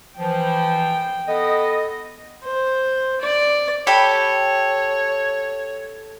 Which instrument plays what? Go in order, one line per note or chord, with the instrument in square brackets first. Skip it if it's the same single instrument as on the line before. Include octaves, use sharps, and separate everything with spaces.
[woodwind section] E3 F3 [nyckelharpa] G5
[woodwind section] B3 A4 D#5
[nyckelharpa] C5
D5
[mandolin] G4 A4 B5 [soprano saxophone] C#5